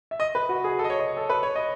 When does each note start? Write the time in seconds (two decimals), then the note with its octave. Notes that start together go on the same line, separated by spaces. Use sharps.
0.11 E5
0.20 D#5
0.35 B4
0.49 F#4
0.64 G#4
0.79 A4
0.84 D#5
0.90 C#5
1.00 D#5
1.17 A4
1.30 B4
1.43 C#5
1.55 D#5